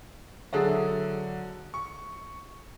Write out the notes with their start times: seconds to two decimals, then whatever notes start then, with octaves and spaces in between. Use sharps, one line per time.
0.53 D3 F#3 G#4 A4 E5
1.74 C#6